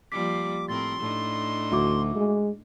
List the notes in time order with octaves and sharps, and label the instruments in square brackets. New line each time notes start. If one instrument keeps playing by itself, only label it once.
[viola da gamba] F3 G3 A#3 [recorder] D6 [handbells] B6
[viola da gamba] A2 C4 A#4 [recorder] C6 [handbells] A6
[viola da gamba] A2 D4 D#4
[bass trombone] D2 [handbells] A3 F#4 D6
[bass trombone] G#3